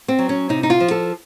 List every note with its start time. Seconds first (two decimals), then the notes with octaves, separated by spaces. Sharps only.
0.08 C4
0.19 F#3
0.29 C#4
0.49 C3 D#4
0.63 D#4
0.70 F4
0.80 F3
0.91 A4